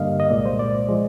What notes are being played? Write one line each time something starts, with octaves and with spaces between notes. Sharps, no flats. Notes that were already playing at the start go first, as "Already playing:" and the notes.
Already playing: G2 D3 G3 A#3 D#5 F5
D#5
C2 A#2 G#3 D5
C5
D5
F3 G#3